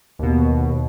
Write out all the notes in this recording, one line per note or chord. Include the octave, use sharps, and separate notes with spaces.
D#2 B2